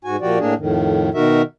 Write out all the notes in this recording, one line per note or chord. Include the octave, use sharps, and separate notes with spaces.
G#2 F#4 G#5
A#2 F3 F#4 G4 D5
A2 A#3 D4 G#4
F2 A2 D#3
B2 D#3 D#4 F#4 A#4 E5